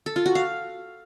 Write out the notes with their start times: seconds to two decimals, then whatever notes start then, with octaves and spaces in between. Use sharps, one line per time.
0.06 A4
0.16 F4
0.26 F#4
0.35 F5